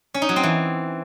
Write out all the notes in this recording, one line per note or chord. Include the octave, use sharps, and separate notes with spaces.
C#4
D#4
F#3
C4
E3